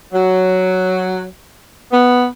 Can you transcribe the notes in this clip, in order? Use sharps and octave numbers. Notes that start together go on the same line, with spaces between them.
F#3
B3